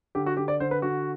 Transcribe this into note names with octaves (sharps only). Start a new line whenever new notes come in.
D3 G4
F#4
D3 G4
D5
D3 C5
B4
D3 F#4